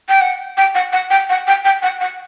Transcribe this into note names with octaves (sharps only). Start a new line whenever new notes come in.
G5
F#5
G5
F#5
F#5
G5
F#5
G5
G5
F#5
F#5